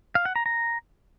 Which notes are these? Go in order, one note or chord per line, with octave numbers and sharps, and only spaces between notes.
F5
F#5
A#5
A#5